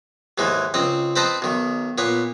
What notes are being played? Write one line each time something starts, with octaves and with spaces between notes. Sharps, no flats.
D#2 G#2 E3 G#3
C#2 C4 D#5
C4 B4 C5 D#5 A5
B1 D#3
A#2 B3 C#5